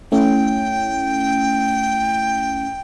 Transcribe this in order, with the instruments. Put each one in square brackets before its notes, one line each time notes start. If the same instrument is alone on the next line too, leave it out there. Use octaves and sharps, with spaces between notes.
[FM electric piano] A3 C#4 E4 [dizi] G5